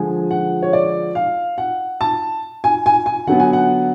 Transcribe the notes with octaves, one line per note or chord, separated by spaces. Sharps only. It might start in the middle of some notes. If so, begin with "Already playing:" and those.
Already playing: D3 F3 G#3 G#5
F#5
C#5
D5
F5
F#5
A5
G#5
G#5
G#5
D3 F#3 B3 F#5
G#5
F#5